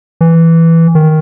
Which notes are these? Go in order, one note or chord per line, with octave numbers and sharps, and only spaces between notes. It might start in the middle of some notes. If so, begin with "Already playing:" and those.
E3
D#3